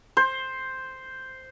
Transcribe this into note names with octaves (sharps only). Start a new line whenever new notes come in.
C5